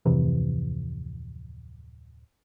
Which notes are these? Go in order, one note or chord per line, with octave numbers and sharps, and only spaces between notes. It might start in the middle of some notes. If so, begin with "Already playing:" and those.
D1 F2 C3 E3